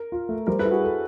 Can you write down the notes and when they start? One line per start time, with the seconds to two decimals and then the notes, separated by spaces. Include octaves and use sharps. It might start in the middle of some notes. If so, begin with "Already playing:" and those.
Already playing: A#4
0.12 F4
0.29 A3
0.47 G3 A#4 C5
0.59 A4 B4
0.65 E4
0.71 F#4 G#4
0.84 A4